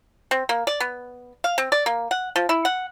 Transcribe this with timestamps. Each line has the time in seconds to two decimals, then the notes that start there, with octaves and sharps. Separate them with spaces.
0.31 C4
0.49 A#3
0.67 D5
0.80 B3
1.44 F5
1.58 C4
1.72 D5
1.86 A#3
2.11 F#5
2.36 F3
2.49 E4
2.65 F#5